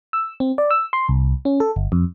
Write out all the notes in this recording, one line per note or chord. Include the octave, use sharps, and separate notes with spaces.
E6
C4
D5
E6
C6
C2
C#4
A4
G1
F2